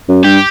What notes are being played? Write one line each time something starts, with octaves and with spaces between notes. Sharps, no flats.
F#2
G2 G4